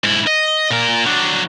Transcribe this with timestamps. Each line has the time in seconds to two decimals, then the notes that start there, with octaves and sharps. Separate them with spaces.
0.04 G#2 E4
0.27 D#5
0.71 A#2 A#4
1.06 F#3 D4